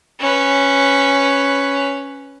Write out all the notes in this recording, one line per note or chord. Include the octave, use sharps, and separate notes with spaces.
C#4 B4